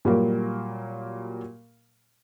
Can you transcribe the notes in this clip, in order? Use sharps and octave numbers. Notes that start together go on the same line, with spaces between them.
A#2 F#3 G3 A#3 A#4